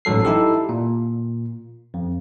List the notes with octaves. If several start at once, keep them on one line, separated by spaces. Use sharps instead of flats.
A1 G#2 F#3 A4 C7
D#4 E4 G4 A4
A#2
F2